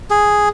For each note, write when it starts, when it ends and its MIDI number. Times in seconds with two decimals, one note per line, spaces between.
0.11 0.49 68